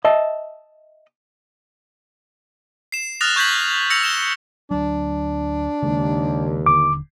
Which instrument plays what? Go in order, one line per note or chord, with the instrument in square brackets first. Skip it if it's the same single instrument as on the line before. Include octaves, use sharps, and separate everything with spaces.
[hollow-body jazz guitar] D#5 E5 A5
[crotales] C7 E7
D#6 F6 F#6 A6 A#6 F7
C#6 G6 G#6 B6 F#7
E6 A#6 C#7 F7
E7 G7
[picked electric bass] D2 F#3 [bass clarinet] D4
[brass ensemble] D#2 [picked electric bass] C#3 G#3
[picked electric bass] D#1 D3 [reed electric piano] D6